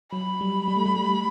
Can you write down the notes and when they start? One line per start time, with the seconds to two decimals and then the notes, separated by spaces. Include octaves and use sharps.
0.11 F#3 B5
0.41 G3
0.68 G3
0.76 A3
0.86 G3
0.97 G3